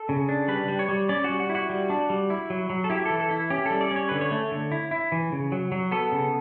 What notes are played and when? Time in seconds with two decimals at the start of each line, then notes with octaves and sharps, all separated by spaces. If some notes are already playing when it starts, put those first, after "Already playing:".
Already playing: A4
0.09 C#3
0.29 D4
0.48 G3 B4
0.68 G3
0.79 C#5
0.89 G3
1.09 C#4 D5
1.24 G3 F#4
1.40 F#4
1.49 E4
1.55 F#4
1.70 G3
1.90 D4
2.10 G3
2.30 E4
2.50 F#3
2.70 F#3
2.84 A4
2.90 E4 G4
3.06 E3 A4
3.20 A4
3.31 E4
3.50 C#4 G4
3.66 G3 A4
3.81 D5
3.91 C#4
3.96 C#5
4.09 D3 B4
4.21 C#5
4.31 A3
4.52 D3
4.72 E4
4.91 E4
5.12 E3
5.32 C#3
5.52 F#3
5.72 F#3
5.92 B3 A4
6.12 C#3